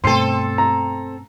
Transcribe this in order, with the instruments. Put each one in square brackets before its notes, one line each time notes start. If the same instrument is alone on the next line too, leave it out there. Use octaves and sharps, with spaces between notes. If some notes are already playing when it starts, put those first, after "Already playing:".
[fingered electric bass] G2 B2 A3 [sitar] C4 A4 [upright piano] C6 C7
[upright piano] A#5